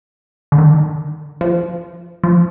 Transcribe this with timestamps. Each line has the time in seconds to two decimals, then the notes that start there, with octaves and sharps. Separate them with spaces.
0.52 D3
0.58 D#3
1.41 F3
2.24 F3